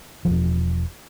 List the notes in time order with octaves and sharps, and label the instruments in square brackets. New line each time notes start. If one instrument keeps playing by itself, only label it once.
[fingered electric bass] E1 C2 F3